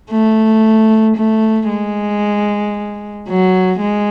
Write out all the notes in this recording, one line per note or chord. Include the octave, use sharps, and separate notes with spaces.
A3
A3
G#3
F#3
G#3